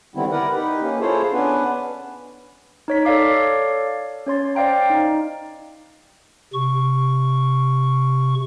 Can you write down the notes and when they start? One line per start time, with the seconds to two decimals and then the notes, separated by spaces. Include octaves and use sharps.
0.15 D3 D#3 G3 B3 C4 E4
0.31 E4 A#4 B4 D5 F#5
0.54 D#4 G4 B4
0.82 A#3 C#4
1.00 E4 F4 G#4 A4 C5 C#5
1.33 B3 C#4 D4 B4
2.88 D#4 C#5 B6
3.05 A4 C#5 D5 F5 D6
4.26 C#4 C#5 C6 A6
4.55 C5 D5 F5 G5 A#5
4.90 D#4
6.53 C3 C#6